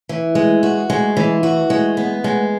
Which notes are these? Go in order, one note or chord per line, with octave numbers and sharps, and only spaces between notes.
E3
G#3
F#4
G#3
E3
F#4
G#3
B3
G#3